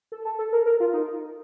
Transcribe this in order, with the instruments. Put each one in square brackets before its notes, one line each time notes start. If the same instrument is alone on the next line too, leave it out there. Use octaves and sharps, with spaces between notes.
[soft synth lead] A4
A4
A4
A#4
A#4
F4
D#4